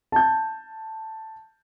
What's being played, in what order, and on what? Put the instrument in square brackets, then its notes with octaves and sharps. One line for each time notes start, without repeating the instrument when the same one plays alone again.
[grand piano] A5 G6